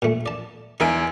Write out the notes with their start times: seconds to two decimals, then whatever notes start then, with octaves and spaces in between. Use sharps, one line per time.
0.02 A#2 A3
0.26 D5 A5
0.80 E2 D#4 A#4 E5 G#5 D7